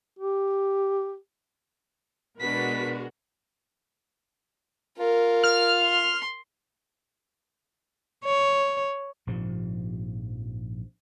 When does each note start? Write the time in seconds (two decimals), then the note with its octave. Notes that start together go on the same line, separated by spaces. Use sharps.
0.19 G4
2.40 B2 G#3 D4 F#4 A#4 B4 B6
4.98 F4 A#4
5.43 F6
5.81 C6
8.24 C#5
9.27 A#1 G#2 C3 F3